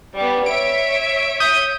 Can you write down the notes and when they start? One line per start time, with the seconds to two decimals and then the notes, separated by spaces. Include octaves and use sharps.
0.16 G3 B3
0.46 C#5 E5 D7
1.40 D#6 G6 D#7